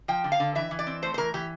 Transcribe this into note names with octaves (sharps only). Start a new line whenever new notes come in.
F3 G5
D3
F5
D3
E3 E5
E3
D5
C4
A3 C5
C5
E3 A#4
E3 G4